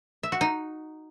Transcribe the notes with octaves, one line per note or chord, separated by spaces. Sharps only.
E5
F#4
D#4